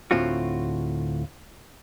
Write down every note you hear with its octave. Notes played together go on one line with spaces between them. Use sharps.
D2 A2 C4 F4 F#4